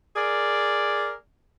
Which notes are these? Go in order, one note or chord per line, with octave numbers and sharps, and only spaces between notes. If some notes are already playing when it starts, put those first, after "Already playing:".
G#4 A#4 D5